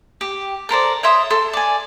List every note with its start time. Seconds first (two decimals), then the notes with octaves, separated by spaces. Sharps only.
0.21 G4
0.69 A4 A#4 C5 D5
1.03 C#5 E5 C6 D#6
1.30 A4 C6
1.53 D5 G#5